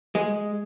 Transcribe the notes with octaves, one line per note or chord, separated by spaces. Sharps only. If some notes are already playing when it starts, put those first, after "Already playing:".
G#3